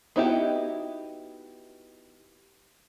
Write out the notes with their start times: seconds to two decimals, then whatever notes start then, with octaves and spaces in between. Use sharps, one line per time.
0.16 B3 D#4 E4 F#4 G4